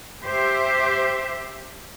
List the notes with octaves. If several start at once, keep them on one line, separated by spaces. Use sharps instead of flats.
G4 C5 E5